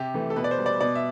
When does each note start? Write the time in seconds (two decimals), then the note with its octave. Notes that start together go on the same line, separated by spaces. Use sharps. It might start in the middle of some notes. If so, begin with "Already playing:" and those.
Already playing: C3 G4
0.14 E3 A3
0.30 A4
0.36 B2 B4
0.44 D5
0.51 C5
0.58 G3
0.66 D5
0.81 B2 D5
0.95 E5